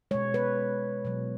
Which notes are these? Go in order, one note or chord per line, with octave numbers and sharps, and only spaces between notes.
B2 G#3 C#5
B4
B2 F#3